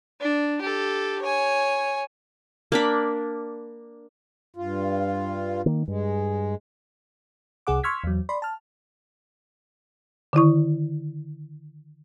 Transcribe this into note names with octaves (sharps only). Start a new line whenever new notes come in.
D4
G4 A4
C#5 G#5
A#3 D4 B5
G2 F4
D#3 A#3
G2 G#3
C2 C3 G#4 F#5 D6
C6 C#6 E6 F6 G#6 B6
E2 F#3
D5 B5 C6
A5 F6
D3 D#3 E4 C#6